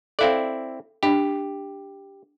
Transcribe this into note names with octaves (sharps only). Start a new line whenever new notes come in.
C4 E4 A4 D5 F5
D4 G4